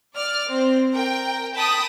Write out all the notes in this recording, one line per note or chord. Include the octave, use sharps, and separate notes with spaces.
D5 F6
C4
A#4 G5
G5 A5 B5 D#6